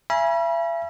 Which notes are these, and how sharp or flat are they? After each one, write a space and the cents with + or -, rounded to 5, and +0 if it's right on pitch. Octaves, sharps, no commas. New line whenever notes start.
E5 +40 G#5 +0 B5 -40